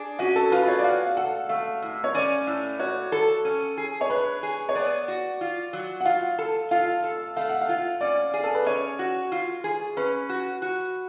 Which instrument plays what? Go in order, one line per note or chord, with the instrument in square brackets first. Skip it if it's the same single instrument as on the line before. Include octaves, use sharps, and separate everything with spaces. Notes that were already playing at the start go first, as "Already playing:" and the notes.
Already playing: [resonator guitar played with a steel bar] D4 [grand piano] G#4
[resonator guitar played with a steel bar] C#4 [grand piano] F#4
[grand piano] A4
[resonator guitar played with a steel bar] F4 [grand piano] B4
[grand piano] B4
C#5
D5
[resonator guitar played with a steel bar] F#4 [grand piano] F5
[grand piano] F5
[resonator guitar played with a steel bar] A4 [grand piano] F#5
[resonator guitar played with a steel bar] A3 [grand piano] F5
[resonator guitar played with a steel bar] A2
[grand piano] C#5
[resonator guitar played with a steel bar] C#4 [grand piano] D5
[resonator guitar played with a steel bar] A2
[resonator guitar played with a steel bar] F#4 [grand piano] C#5
[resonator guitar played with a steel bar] A4
C#4
G#4
[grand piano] C#5
[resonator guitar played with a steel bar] D4 [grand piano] B4
[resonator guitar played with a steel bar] G#4
[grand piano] C#5
[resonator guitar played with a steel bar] B3 [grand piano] D5
[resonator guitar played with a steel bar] F#4
F4
F#3
[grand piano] F#5
[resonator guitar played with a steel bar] F4 [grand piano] F5
[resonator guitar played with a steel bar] A4
[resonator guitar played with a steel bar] F4 [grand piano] F5
[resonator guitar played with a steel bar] A4
[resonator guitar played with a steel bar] A3 [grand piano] F5
[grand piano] F#5
F5
[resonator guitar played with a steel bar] F4
[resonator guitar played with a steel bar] C#4 [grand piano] D5
[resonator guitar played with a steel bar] G#4
[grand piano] A4
B4
[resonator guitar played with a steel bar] C#4 [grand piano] C#5
[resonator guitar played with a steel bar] F#4
F4
G#4
[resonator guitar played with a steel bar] C#4 [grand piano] B4
[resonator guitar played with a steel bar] F#4
F#4